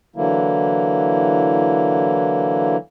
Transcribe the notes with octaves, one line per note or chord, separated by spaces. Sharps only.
D3 E3 F#3 A#3 E4